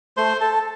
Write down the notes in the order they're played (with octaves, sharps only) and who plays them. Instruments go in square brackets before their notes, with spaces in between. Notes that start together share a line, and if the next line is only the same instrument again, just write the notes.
[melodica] A3 C5 C6
A4 A5